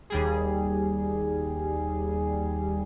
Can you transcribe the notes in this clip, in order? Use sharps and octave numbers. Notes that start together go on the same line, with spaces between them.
D#2 G3 G#4